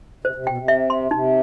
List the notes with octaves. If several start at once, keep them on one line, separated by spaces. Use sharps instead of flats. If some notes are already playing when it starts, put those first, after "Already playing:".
C3 C5
C3
B2 G5
C3
E5
C6
C3 D#4